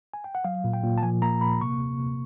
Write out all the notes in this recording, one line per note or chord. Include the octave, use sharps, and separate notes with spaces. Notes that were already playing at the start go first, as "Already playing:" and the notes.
G#5
G5
F#5
F#3 F5
A#2
G5
A#2
A5
F3 G#5
A#3 A#5
A#3 B5
C3 C#6
C3
C3